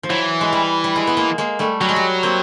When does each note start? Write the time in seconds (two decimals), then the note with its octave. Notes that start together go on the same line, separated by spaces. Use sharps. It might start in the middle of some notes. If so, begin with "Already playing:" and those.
0.03 F3
0.10 E3 F#3
0.41 G#3
0.53 G3
0.84 G3
0.96 G#3
1.07 B3
1.17 G#3 A#3
1.38 G#3 A#3
1.59 G3 A3
1.81 F#3 G3
1.89 G#3
1.96 G3
2.23 A#3 C4